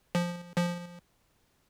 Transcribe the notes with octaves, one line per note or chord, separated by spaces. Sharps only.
F3
F3